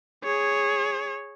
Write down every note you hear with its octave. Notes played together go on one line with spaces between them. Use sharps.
G#4 C#5